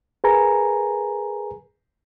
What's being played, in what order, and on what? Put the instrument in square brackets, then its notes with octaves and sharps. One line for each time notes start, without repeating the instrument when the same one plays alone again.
[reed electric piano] G#4 A#4 B4 G#5 A#5